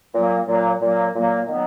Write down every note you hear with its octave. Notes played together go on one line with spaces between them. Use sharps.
A#2 F#3 A#3
A#2 F#3 A#3
A#2 F#3 A#3
A#2 F#3 A#3
D#3 F#3 B3